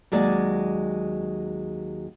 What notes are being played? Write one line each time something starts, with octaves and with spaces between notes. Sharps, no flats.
D#2 F#3 G#3 D5